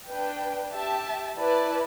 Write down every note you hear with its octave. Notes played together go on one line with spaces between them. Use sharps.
D4 B4 G5
G4 E5 A5
E4 B4 D5 A5